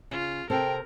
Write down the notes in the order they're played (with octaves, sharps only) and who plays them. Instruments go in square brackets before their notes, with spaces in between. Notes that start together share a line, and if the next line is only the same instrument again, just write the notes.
[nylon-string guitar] C#3 [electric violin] F4
[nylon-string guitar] C3 C4 A4 [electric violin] A#4 [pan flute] G5